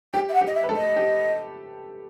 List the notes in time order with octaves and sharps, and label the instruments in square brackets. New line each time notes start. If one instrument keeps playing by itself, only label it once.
[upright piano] G4 [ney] G5
[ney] E5
F#5
[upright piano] G4
[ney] D#5
E5
[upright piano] B4
A3 A4
[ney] D#5
[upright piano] G4